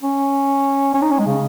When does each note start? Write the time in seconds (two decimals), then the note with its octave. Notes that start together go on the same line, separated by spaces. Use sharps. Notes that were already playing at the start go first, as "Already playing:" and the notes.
0.03 C#4
0.94 C#4
1.02 D#4
1.11 C#4
1.19 G#3
1.27 C#3